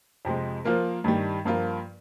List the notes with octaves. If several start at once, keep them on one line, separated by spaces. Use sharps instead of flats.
F2 C3 F3 G#3
F3 A#3 F4 A#4
G2 D#3 G3
G2 F3 A#3 F4 A#4